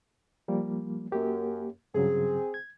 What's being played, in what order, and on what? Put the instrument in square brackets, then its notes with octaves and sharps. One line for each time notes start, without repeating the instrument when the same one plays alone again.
[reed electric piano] F3 G3 A#3
[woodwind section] F#2 [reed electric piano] A#3 G4
[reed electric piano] G2 C#3 F#3 [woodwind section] C4 G#4
[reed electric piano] G#6